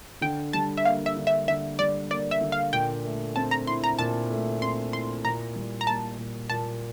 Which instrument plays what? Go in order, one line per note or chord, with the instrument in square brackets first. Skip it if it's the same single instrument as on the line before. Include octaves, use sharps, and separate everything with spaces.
[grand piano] D3 [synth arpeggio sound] G5
[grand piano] G3 [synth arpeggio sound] A5
[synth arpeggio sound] E5
[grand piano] A#3 [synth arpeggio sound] F5
[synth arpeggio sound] E5
[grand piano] D3
[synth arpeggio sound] E5
[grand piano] D3 [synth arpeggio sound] E5
[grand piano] G3 [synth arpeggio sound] D5
[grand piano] A#3 [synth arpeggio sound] D5
[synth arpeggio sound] E5
[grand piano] D3
[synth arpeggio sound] F5
[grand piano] A#2 [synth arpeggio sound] G5
[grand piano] A3
[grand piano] C4 [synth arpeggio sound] A5
[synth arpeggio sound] A#5
[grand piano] E4 [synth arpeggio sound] C6
[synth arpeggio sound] A#5
[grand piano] A#2 [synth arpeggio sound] A5
[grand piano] A3
[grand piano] C4 [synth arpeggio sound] C6
[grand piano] E4 [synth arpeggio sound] C6
[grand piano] A#2 [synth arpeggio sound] A#5
[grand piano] G3
[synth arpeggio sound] A#5
[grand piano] A#3 [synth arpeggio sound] A5
[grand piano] A#2
[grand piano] A#2 [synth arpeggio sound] A5